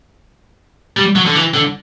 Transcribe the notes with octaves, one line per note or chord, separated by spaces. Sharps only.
G3
F#3
D3
E3
D3